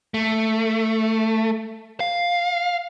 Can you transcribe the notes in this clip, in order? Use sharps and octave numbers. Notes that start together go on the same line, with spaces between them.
A3
F5